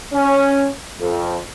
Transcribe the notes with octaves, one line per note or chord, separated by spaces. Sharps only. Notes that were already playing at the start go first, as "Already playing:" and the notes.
C#4
F2